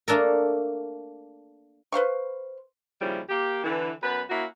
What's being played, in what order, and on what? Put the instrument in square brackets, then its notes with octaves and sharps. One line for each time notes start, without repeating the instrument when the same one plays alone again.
[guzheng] A3 A#3 D4 A4 A#4
[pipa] B4 C5 F5 C#6
[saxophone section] D#2 C#3 F3 G3 E4
A#3 G4
D3 E3
F#2 B3 B4
A#3 C#4 E4 F#4